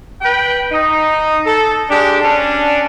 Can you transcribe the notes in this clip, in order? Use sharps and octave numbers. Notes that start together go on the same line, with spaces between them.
B4 G5
D#4
A4
G#3 D4 G4
C#4 D4